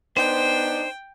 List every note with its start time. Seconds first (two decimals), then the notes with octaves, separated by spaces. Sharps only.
0.17 B3 D4 D#4 C5 G5